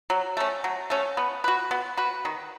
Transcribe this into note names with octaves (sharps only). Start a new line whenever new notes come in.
F#3
A3 C#4
F#3
A3 C#4
B3
F#4 B4
B3
F#4 B4
D#3